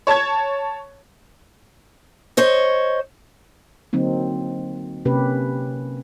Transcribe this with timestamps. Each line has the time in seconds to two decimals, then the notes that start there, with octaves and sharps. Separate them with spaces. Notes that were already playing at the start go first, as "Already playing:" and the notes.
0.07 C#5 A5 C#6 G#6
2.37 C5 C#5 D#5
3.93 D3 F#3 A#3 C4 D#4
5.05 C3 A#3 C#4 G4 B4